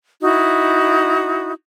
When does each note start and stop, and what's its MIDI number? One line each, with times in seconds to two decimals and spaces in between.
0.22 1.52 63
0.22 1.52 64
0.22 1.52 66